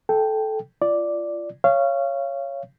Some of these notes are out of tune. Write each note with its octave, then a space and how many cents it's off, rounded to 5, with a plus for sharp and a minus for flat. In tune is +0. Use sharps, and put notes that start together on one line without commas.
A4 -15 G5 +0
F4 -25 D5 +0
C#5 +0 F5 -25